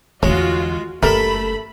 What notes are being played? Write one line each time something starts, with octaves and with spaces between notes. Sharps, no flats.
E2 D3 G#3 F4 F#4 C#5
F#1 G3 A3 A4 A#4 E5 B5